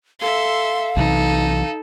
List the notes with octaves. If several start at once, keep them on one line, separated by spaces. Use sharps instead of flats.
A4 E5 F5 C6
B1 C3 E3 D#4 A4